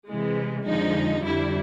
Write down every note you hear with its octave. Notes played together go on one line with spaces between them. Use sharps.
C3 E3 G#3
F2 D3 F3 G#3 D#4
F2 D3 G3 E4